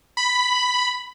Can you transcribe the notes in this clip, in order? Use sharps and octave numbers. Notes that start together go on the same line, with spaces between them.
B5